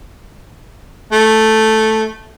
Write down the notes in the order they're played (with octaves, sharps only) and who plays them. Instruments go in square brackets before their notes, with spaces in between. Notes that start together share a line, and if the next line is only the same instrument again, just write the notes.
[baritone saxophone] A3